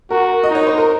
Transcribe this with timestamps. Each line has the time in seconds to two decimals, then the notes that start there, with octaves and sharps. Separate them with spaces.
0.10 F#4 A#4
0.44 D#5
0.50 D#4 C#5
0.67 C5
0.78 A#4